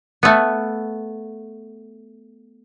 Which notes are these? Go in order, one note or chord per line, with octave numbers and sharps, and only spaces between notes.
A3 B3